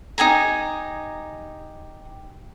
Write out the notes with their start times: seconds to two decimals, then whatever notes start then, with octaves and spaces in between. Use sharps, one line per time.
0.18 D#4 G4 G#5 A#5